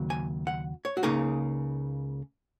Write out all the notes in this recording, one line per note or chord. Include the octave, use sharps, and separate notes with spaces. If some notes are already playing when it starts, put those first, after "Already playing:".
Already playing: D#2 C#3 F#3
G#5
F#5
C#5
F#4
C#2 C#3 A#3 D#4 G#4